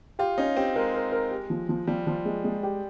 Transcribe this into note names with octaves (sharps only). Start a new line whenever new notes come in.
F4 G4
C#4 D#4
C4 G4
G#3 A#4
A#4
A#4
G4
F3
F3
F3 G3
F3
G#3
G#3
G4